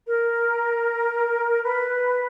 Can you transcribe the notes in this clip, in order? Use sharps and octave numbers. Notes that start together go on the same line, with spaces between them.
A#4
B4